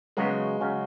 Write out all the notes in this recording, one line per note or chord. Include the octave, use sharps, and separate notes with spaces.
C#3 F#3 G#3 B3 F#4
C#3 F#3 C#4